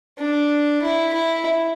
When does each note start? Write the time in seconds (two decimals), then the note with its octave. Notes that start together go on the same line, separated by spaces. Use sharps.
0.19 D4
0.83 E4
1.13 E4